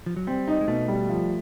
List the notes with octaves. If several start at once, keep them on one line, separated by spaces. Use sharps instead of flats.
F3
F#3
G3 C4
D#4
G#3
B2 A3
G3
F3